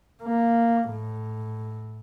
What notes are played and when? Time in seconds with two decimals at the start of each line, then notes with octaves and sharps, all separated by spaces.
0.23 A#3
0.89 A2